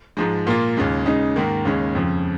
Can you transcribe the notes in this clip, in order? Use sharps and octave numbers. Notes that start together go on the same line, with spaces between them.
G#2 F3 G#3
A#2 A#3 F4
D#2 C#3 G#3
C#3 G#3 D#4
G#2 D#3 A#3
D#2 C#3 G#3 C#4
F2 C#3 F3